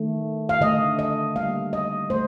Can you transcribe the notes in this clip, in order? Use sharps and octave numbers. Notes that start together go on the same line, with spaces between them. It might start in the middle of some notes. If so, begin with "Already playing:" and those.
Already playing: D#3 A3
F5
D3 A3 D#5
D#5
D3 G3 A#3 F5
D#5
A3 C5